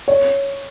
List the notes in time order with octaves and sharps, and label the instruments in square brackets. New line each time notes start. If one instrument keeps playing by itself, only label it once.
[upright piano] C#5